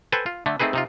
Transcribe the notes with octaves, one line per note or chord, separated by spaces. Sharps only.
A4 B4 C5 G5 G#5
F4
D3 A3
A3 C4 D#4 G#4 B4
C3 D#4 F4